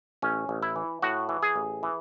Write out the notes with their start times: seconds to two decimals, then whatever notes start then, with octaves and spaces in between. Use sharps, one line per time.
0.22 A1 C#4
0.49 A1
0.63 E4
0.76 E3
1.02 A2 F#4
1.29 E3
1.43 G#4
1.56 A1
1.83 E3